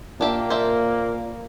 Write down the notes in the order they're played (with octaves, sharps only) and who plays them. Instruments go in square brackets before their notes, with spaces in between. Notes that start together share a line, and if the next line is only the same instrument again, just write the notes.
[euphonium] A#2 [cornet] A#3 [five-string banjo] D4 G4 E5
[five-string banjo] C5 D5 E5